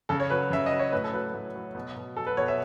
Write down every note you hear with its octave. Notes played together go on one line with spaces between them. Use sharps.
C#3 A4
C#5
F#3 B4
C#3 E5
D#5
F#3
C#5
A2 B4
A4
F#3 B4
A2
F#3
B2
B2
F#3 A4
B4
B2 C#5
E5